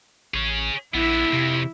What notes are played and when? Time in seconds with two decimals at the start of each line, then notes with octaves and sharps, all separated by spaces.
0.34 A1 G#4 C#5
0.94 A#1 D3 B3 E4
1.33 F2 C3